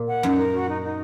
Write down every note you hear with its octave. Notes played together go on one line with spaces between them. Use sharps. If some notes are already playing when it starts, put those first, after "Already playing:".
Already playing: A#2
F#5
F#2 D#4
A#4
F#4
D#4
D#4